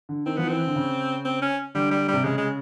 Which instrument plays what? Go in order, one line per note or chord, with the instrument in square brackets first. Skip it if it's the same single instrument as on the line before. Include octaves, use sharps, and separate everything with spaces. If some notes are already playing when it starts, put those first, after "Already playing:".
[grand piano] D3
[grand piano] D#3 [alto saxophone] C4
[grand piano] F3 [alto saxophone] B3
[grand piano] D#3
[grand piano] E3 [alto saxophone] C4
[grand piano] D3
C#3
[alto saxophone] C4
C#4
[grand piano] D3 [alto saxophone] G3
[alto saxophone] G3
G3
[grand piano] C3
[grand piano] C#3 [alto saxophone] G#3
[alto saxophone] G#3